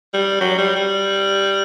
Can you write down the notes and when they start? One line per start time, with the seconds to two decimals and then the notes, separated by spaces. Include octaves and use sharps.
0.14 G3
0.40 F#3
0.58 G3
0.76 G3